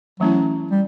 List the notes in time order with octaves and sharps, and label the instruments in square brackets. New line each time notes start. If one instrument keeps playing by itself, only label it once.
[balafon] E3 A3 C#4 E4 [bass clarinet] F#3
[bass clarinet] G3